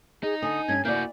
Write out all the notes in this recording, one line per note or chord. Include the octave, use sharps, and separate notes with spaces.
D#4 G#4
D3 G#5 D#6
G2 C#4 G#6
A#3 E4 F#4 D5 G6